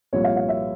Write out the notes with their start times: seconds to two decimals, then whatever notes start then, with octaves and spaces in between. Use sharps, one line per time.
0.13 C2 A#2 F3 C#5
0.24 F5
0.36 F5
0.49 E5